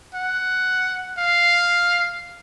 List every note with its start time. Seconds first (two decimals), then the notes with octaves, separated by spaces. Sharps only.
0.14 F#5
1.17 F5